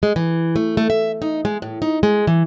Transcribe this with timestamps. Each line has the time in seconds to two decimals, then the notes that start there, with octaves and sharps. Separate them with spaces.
0.03 G#3
0.16 E3
0.56 A3
0.77 A3
0.90 E5
1.22 D#4
1.45 G#3
1.62 A2
1.82 D#4
2.03 G#3
2.27 E3